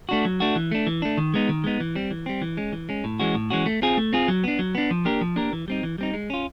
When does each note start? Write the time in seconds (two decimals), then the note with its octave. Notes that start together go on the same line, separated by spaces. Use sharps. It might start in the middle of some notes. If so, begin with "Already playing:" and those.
0.09 A3 D4 F#4
0.25 F#3
0.40 A3 D4 F#4
0.56 E3
0.71 A3 D4
0.87 E3
1.02 A3 D4
1.18 D#3
1.34 G#3 B3 D#4
1.49 D#3
1.64 G#3 B3 D#4
1.80 E3
1.95 G3 C4
2.11 E3
2.26 G3 C4
2.42 E3
2.57 G#3 C#4
2.72 E3
2.89 G#3 C#4
3.04 A2
3.20 E3 G#3 C#4 F#4
3.35 A2
3.50 E3 G#3 C#4 F#4
3.66 A3
3.82 C4 F4 G#4
3.97 A3
4.13 C4 F4 G#4
4.28 F#3
4.44 B3 D4
4.59 F#3
4.75 B3 D4
4.91 F3
5.05 A#3 D4 G4 A#4
5.21 F3
5.36 A#3 D4 G4 A#4
5.53 E3
5.68 G3 C4 D#4
5.83 E3
5.98 G3 C4 D#4
6.14 G#3
6.30 C#4 F4